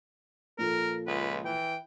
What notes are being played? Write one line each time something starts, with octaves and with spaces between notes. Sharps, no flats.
A#2 F3 A4 A#4
C#2 B4
E3 G5